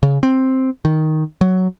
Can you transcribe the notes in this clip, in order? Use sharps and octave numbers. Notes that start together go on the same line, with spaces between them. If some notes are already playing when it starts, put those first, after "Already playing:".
C#3
C4
D#3
F#3